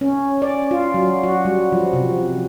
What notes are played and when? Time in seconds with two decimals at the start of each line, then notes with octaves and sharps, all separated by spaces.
0.01 C#4
0.42 D5
0.71 F4
0.94 F#3
1.23 F#4
1.45 G3
1.72 F3
1.93 C3